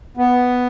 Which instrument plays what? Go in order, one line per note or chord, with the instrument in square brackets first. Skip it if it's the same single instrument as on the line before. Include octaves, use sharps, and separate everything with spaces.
[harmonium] B3